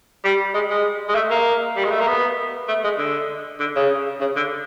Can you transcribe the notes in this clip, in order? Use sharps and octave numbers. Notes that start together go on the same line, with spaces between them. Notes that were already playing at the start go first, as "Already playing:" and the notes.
G3
G#3
G#3
G#3
A3
A#3
G3
G#3
A3
A#3
B3
A3
G#3
D3
D3
C#3
C#3
D3